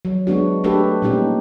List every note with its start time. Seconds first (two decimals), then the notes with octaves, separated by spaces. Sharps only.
0.05 F#3
0.27 G#3 B3 D4 F#4
0.64 A3 D4 F#4 G4 A4 B4
1.02 A#2 G3 C#4 D#4 G4